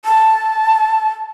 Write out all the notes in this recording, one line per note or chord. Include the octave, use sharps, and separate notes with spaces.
A5